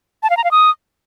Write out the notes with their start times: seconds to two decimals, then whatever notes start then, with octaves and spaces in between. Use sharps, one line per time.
0.23 A5
0.30 F5
0.37 A#5
0.44 F5
0.51 D#6